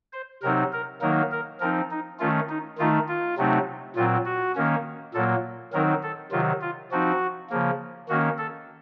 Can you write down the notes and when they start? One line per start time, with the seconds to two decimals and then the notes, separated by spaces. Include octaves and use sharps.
0.13 C5
0.42 C3 F#3 C4 D#4 A#4
0.73 A#4
1.01 D#3 F#3 A#3 D#4 A#4
1.32 A#4
1.60 F3 C4 D#4 A#4
1.91 D#4
2.19 D#3 A3 C#4 F4
2.49 D#4
2.78 D#3 A3 D#4 F4
3.08 F4
3.38 C3 F#3 A3 C4 D#4
3.96 A#2 F#3 C4 F4
4.25 F#4
4.55 D#3 A#3 C#4
5.14 A#2 F#3 A#3 A4
5.73 D#3 F#3 C4 D#4 A#4
6.03 A4
6.32 C3 D#3 F#3 F4
6.62 F4
6.91 F3 C4 D#4 F#4
7.50 C#3 F3 A#3
8.09 D#3 A#3 C#4 F#4
8.38 A4